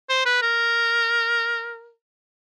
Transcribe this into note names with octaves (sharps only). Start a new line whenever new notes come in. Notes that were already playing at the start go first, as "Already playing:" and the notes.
C5
B4
A#4